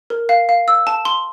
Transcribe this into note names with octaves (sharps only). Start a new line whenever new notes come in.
A#4
F5
F5
E6
A5
C6